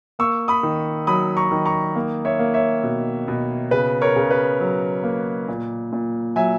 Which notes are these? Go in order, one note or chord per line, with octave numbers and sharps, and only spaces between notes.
A#3 C#6 E6
B5 D#6
D#3
F#3 B5 D#6
A#5 C#6
D#3
A#5 C#6
A#3
C#5 E5
A#3
C#5 E5
B2
B2
C#3 B4
A#4 C#5
C#3
B4
F#3
A#3
A#2
A#2
F#3 E5 G#5